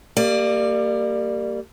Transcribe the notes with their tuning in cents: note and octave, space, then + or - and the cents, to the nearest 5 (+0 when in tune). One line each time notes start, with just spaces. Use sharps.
G3 +0 A#3 -25 D5 +20